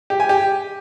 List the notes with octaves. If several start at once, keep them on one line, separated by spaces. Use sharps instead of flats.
G4
G#5
G4